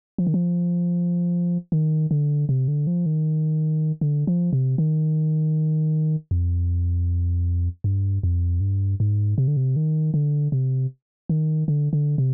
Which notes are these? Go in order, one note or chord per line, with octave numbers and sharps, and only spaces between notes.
F3
D#3
F3
D#3
D3
C3
D3
F3
D#3
D3
F3
C3
D#3
F2
G2
F2
G2
G#2
C3
D3
C3
D#3
D3
C3
D#3
D3
D3
C3